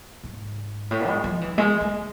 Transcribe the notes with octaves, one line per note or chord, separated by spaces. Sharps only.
G#2
A2
G#3
F3
E3
G#3
A3